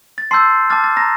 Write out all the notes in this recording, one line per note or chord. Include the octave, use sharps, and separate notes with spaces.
A6
A5 C6 E6 G6 C7
A5 D6 F6 A6
A6
A#5 A#6